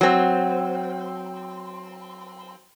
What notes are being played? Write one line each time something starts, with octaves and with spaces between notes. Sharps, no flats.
F#3 C4